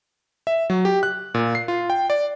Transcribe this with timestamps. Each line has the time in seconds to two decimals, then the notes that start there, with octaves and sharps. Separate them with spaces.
0.47 E5
0.70 F#3
0.85 G4
1.03 F#6
1.34 A#2
1.55 C7
1.68 F4
1.90 G5
2.10 D5